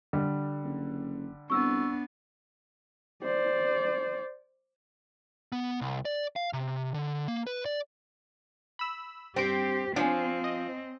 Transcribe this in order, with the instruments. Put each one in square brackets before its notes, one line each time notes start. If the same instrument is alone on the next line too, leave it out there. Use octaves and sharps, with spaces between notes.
[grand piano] D3 G3
[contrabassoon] F#1
[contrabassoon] C2 [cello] B3 D4 [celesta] C#6 E6
[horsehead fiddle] C5 D5
[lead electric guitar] B3
C2
D5
F5
C3
D3
A#3
B4
D5
[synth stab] B5 E6
[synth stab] G2 D7 [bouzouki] C4 [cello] G4
[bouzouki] F3 [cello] C4 [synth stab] D4 [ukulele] C#5 G#5
[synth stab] D#5